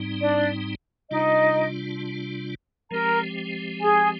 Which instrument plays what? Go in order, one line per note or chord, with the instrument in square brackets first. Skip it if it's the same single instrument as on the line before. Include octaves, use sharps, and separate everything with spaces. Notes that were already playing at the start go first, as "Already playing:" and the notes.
Already playing: [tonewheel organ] G#2 G3 C4 D#4
[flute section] D4 D5
[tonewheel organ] C3 G3 D4 F4 [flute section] D#4 D#5
[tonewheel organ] F3 G#3 C4 G4 [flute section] A#4 A#5
[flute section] G#4 G#5